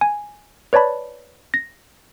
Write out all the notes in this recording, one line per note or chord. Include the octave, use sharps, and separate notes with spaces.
G#5
B4 C#5 D5 A5 B5
A#6